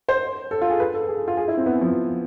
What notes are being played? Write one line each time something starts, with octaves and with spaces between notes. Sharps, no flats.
C5
A4
F4
G#4
B4
A4
G#4
F4
G#4
E4
C4
B3
F3